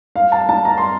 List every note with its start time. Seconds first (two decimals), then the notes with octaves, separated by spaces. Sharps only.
0.16 F5
0.32 A5
0.49 A5
0.65 A#5
0.77 C6